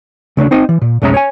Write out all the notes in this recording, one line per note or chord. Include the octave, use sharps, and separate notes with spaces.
C#3 A3 C#4 D4
C4 D#4 C5 D#5
E3
A#2
B1 F2 G#3 C#4 E5 A#5
C#5 G#5